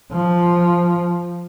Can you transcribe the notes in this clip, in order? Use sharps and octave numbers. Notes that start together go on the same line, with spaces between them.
F3